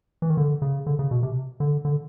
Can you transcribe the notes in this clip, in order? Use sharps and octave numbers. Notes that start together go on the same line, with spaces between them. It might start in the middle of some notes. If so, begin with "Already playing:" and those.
E3
D#3
D3
C#3
D3
C#3
B2
C3
D3
D3